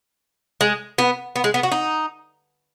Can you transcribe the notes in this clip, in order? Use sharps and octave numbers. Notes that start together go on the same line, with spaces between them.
G#3
B3
B3
G#3
B3
F#4
D#4